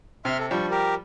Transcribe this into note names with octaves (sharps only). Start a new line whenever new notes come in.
C3 E5 C6 F6
A4
F3 G3 D4 C#6
G4 A#4